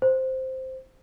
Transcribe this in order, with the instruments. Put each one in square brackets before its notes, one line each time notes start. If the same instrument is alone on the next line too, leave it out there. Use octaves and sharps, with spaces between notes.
[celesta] C5